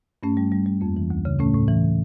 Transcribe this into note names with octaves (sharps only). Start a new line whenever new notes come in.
G2 A3 C#4
G3
G3
G3
F2 A#3
E3
D2
C#3
A2 A3 C#4
A2
E3